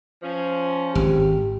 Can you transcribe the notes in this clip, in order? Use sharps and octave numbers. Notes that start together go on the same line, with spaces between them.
F3 C#4
G#1 G4